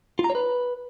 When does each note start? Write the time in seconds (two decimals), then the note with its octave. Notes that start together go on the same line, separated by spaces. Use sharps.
0.19 F4
0.24 A#5
0.30 C#5
0.35 B4